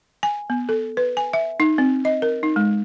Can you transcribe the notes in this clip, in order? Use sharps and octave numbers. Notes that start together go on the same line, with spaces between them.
G#5
B3
A4
B4
G#5
E5
D#4
C4
D#5
A#4
D#4
G#3